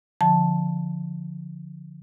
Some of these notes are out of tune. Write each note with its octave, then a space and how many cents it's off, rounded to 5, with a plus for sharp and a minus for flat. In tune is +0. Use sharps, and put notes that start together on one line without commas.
D3 -10 F3 +0 A5 +0